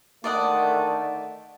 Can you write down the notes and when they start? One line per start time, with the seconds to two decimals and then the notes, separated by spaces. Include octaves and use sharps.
0.24 D3 D#3 A3 D5 D#5 F#5